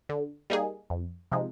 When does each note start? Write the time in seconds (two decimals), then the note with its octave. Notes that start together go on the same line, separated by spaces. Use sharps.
0.09 D3
0.50 G3 A#3 D#4 G#4
0.90 F2
1.32 C3 F3 G#3 D#4